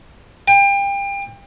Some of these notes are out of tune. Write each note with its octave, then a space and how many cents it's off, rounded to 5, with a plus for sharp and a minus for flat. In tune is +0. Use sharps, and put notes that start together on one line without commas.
G5 +30